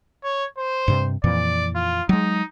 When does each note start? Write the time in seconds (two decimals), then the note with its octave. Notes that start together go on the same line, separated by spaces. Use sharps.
0.24 C#5
0.58 C5
0.88 G2 C3
1.24 F2 A#2 E3 D5
1.75 F4
2.09 F#3 G#3 D#4